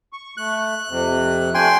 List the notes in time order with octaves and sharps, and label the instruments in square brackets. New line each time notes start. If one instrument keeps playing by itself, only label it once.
[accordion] C#6
[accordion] A3 [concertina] F#6
[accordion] F2 C3
[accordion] A3 D4 [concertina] G5 G#5 C6